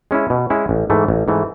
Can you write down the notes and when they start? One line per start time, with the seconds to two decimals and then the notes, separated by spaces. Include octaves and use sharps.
0.11 G#3 C#4 E4
0.30 B2
0.50 G#3 C#4 E4
0.69 A1
0.90 G#2 E3 A3
1.08 A1
1.28 G#2 E3 A3